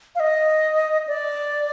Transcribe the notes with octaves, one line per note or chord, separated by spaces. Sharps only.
F5
D#5
D5